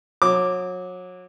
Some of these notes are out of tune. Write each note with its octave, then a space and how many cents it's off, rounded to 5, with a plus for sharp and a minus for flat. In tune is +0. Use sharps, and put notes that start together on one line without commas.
F#3 -30 D6 +0